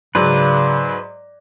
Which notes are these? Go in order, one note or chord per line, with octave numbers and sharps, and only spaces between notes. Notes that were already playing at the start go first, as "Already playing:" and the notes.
G#2 C#3 F#3 B4 D5